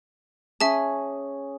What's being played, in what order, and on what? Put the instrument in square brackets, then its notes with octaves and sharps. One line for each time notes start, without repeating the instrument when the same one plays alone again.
[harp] C#4 G#4 [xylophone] E5 A5